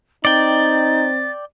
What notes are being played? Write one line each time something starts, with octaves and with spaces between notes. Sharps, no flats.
C4 D#4 D5 G5 A6